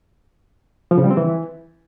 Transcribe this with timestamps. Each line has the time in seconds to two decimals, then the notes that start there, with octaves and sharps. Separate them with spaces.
0.91 F3
0.98 C#3
1.04 G3
1.11 C4
1.17 E3